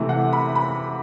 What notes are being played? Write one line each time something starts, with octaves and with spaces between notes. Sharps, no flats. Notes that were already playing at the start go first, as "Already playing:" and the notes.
Already playing: C3 E3 A3
F#5
B5
B5